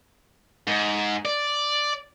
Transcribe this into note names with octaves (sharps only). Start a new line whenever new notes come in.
G#2
D5